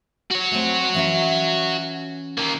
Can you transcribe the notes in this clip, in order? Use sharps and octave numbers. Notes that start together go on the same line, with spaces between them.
F#4 C#5
A3 C4
E3 C#4 E5
D#3 A#3